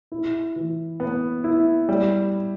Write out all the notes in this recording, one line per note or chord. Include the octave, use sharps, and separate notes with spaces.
E4
E3
B3
E4
G3